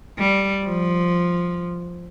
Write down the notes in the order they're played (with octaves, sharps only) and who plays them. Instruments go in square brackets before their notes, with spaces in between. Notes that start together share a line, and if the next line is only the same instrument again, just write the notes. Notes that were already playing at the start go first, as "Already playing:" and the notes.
[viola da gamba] G3
F3